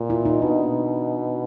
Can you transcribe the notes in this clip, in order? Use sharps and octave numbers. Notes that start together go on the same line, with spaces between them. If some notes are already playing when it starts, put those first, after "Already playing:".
Already playing: A#2
E4
D#4
B2 D4